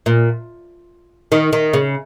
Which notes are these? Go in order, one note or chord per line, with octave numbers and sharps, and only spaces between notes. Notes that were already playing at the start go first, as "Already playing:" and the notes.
A#2
D#3
D#3
C#3